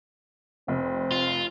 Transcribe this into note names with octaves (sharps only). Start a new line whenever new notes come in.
F1 C4
F4